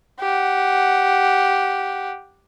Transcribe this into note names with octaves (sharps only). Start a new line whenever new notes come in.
G4 F#5